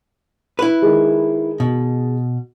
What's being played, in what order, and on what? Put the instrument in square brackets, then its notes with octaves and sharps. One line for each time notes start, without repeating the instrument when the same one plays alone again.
[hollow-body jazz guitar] E4 B4
[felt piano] D#3 G#3
[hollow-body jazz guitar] B2